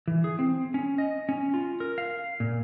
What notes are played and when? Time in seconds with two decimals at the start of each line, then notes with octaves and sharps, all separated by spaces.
0.08 E3
0.24 G#4
0.39 C4
0.74 C#4
0.98 D#5
1.29 C#4
1.54 F4
1.80 A#4
1.98 F5
2.40 A#2